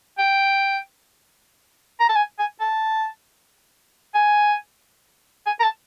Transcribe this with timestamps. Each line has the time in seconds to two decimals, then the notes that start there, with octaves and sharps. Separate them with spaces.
0.19 G5
2.00 A#5
2.09 A5
2.16 G#5
2.39 G#5
2.61 A5
4.15 G#5
5.46 G#5
5.60 A#5
5.63 A5